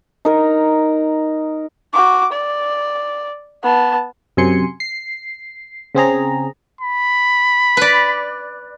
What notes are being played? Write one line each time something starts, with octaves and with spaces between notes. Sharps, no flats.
D#4 A#4
F#4 D6
D5
B3 A5
F#2 C3 G#5 C6 C#7
C7
C#3 C4 G#4 A#5
B5
B4 D5